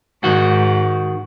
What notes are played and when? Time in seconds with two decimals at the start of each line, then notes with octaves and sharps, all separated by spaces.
0.24 G#2 D#3 F#4